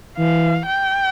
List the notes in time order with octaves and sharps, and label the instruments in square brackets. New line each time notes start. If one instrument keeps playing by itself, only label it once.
[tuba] E3 [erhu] F5
[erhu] G5